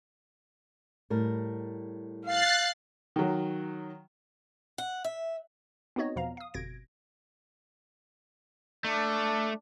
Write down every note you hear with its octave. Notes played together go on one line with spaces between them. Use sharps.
A2 G3 A#4
F5 F#6 A6 C7
D#3 F#3
F#5
E5
B3 C4 D#4 F#4 C#5 D#5
E2 B2 F3 B3 F5 A#5
F5 D#6
G1 F2 B2 G#6 A#6 D7
A3 D4